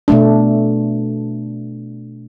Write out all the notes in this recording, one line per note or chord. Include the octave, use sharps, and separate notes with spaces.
B2 A3 D4